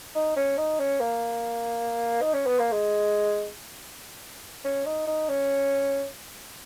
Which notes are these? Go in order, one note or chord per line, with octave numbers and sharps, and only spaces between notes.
D#4
C#4
D#4
C#4
A#3
D#4
C#4
B3
A#3
G#3
C#4
D#4
D#4
C#4